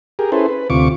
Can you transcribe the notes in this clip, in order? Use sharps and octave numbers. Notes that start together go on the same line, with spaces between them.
G4 G#4 A#4
C#4 E4 G#4 A4 B4 C5
B4
D2 C3 F4 C#6 D6